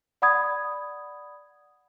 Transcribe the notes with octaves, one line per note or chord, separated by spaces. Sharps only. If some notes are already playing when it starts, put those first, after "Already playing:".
D5 F#5 B5 D#6 G#6